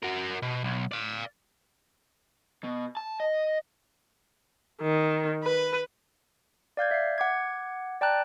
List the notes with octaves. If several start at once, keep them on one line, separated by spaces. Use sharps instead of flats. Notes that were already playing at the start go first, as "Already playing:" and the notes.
F#4 A#4
B2
B1
D5 F5
B2
A5
D#5
D#3
B4
D5 F5 G6 G#6
E5 C7
F#5 D6 G#6
D5 G5 A5 A#5 F#6